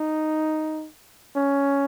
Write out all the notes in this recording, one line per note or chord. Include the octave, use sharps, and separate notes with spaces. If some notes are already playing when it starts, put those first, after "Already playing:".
Already playing: D#4
C#4